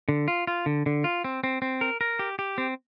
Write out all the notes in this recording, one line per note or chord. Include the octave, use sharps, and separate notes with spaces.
D3
F4
F4
D3
D3
F4
C4
C4
C4
A#4
A#4
G4
G4
C4